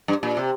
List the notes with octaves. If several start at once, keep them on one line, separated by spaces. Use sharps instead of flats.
G2
A#2
C3